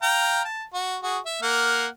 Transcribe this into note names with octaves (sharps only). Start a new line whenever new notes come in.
F5 G5 A#5
A5
F#4
F#4 G#4
E5
A#3 F#5 F6